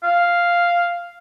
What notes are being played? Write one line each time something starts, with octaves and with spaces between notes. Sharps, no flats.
F5